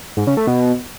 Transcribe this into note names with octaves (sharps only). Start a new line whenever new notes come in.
G#2
C#3
A3
B2